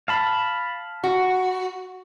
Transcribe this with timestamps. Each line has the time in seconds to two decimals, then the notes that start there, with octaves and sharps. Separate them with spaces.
0.08 F5 A5 B5
1.04 F#4